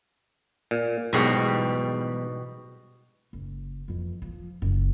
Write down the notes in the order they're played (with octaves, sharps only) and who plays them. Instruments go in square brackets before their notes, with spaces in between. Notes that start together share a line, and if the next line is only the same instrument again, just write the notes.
[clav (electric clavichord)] A#2
[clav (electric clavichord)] B1 E2 G#2 [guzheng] B2 G3
[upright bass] F#1
F2 E3
F3
F#1